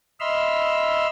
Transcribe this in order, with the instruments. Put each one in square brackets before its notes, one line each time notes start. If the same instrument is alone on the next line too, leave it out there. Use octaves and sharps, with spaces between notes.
[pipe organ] D#5 E5 B5 C6 E6 F6